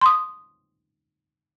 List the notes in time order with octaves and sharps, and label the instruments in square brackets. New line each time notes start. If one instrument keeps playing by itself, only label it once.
[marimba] C6 D#6